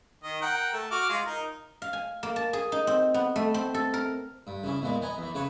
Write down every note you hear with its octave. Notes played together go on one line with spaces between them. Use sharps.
D#3 D#5
A#4 F#5 G5
A3
F#4 D6 F6
G#3 F4
D#4 A#4
F5
G#5
A#3
A5
G#4
D#4
C4
B3
A3
C4
A4
A#4
G2
C#3 E3 C#4
E2 A#2 E3 G#3
B3 D#5 G#5 A#5
E2 E3
C#3 E3 B4 C#5